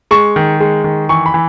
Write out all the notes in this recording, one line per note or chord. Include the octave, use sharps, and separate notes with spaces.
G#3 C#6
D#3
G#3
D#3
E3 C#6
B5
E3